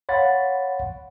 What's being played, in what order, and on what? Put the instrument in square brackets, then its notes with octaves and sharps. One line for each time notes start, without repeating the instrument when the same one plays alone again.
[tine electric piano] C#5 F5 F#5 B5 C6 A6